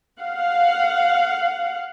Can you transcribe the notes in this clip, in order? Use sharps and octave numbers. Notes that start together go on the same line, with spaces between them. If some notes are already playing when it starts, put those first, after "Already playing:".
F5 F#5